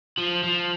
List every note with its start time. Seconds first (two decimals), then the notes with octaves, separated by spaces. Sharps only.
0.18 F3
0.44 F3